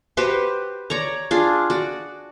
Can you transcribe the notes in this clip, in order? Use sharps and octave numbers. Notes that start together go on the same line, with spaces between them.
F#4 G4 B4 C5
C#5 D5 A#5
D4 F4 G#4
F#4 D5